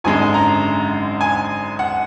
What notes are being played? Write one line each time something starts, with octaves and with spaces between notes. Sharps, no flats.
G#1 F#2 D3 G#3 G#5
A#5
G#5
F#5